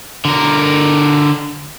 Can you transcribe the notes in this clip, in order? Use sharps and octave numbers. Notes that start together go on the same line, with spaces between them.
D3 A#4